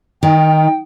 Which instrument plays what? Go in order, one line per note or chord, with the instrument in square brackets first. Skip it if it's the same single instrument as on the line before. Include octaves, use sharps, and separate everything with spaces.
[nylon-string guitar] D#3 [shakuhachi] G5